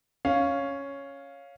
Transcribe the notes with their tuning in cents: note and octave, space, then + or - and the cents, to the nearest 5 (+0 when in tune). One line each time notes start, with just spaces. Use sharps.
C#4 +0 F5 +0